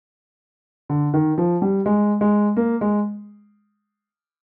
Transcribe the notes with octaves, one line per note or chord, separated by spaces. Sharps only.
D3
D#3
F3
G3
G#3
G#3
A#3
G#3